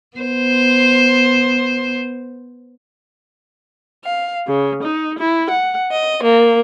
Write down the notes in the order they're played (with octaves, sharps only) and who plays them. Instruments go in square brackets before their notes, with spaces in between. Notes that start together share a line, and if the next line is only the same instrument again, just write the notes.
[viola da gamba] B3 C5
[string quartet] F5
C#3
D#4
E4
F#5
D#5
A#3